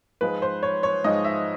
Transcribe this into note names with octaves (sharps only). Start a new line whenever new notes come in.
G#2 F3 G#3 B4
C5
C#5
C#5
G#2 F3 G#3 D#5
E5